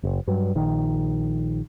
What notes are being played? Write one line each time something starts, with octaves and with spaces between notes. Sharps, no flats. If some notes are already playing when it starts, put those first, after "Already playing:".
F#1
G2 F#3
A#1 D#3